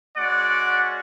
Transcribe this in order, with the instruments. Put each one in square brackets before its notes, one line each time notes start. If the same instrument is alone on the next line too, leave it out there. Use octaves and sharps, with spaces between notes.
[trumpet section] G#3 C#4 F#4 D5 F#5